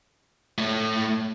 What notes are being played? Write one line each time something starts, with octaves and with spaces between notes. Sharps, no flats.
A2 A3